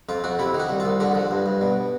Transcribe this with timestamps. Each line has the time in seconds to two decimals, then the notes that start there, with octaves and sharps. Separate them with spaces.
0.09 F2 F4
0.24 F2 F#4
0.39 C3 E4
0.54 D#3
0.60 F#4
0.69 C2
0.80 F4
0.85 C2
1.00 D3 F#4
1.15 F3
1.31 G2
1.46 G2
1.61 B2